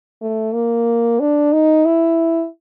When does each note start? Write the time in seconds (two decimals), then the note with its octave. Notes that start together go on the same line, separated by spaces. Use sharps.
0.22 A3
0.54 A#3
1.20 D4
1.52 D#4
1.85 E4